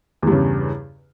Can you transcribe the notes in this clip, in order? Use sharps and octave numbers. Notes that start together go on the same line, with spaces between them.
E2 G2 C#3